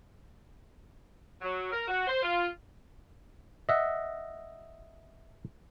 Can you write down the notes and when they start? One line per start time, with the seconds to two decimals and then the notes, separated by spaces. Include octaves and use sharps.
1.41 F#3
1.72 A#4
1.88 F#4
2.07 C5
2.23 F4
3.69 D#5 E5 F#5